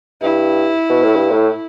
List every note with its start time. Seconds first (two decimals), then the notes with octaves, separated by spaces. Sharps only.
0.22 G2 E4
0.89 B2
1.03 A2
1.16 G2
1.31 A2